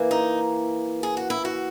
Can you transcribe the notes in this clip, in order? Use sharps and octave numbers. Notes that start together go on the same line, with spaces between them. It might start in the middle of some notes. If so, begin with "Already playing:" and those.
Already playing: E3 A#3
D#4
G#4
F#4
E4
F#4